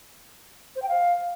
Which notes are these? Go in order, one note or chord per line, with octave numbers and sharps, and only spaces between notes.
C5
G5
F5